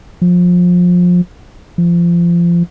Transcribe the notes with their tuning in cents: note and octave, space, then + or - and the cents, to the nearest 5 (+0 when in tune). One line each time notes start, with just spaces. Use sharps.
F3 +25
F3 -25